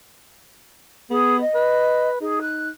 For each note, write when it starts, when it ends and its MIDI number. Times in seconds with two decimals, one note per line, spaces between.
1.10 1.42 59
1.10 1.39 68
1.40 2.08 75
1.55 2.21 71
2.21 2.70 63
2.21 2.39 68
2.41 2.68 90